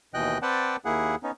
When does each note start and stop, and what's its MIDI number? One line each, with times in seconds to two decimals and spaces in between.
0.14 0.38 39
0.14 0.38 47
0.14 0.38 52
0.14 0.38 75
0.14 0.38 79
0.14 0.38 90
0.42 0.76 60
0.42 0.76 71
0.42 0.76 74
0.42 0.76 78
0.42 0.76 79
0.42 0.76 81
0.85 1.15 39
0.85 1.15 58
0.85 1.15 64
0.85 1.15 68
0.85 1.15 78
1.23 1.31 59
1.23 1.31 61
1.23 1.31 63